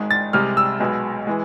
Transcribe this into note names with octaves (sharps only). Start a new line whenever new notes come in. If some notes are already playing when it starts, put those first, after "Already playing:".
Already playing: G#1 G#2 G#3
A6
C2 C3 G#3 F6
E6
B1 B2 G#3
E3 G#3